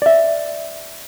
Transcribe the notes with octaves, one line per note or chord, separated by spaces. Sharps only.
D5 E5